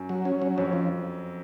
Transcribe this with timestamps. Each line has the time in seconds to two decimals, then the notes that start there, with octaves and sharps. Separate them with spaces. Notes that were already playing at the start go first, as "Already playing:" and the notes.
Already playing: F#2
0.09 F#3
0.25 C#4
0.42 F#3
0.58 F2 C#4
0.73 F3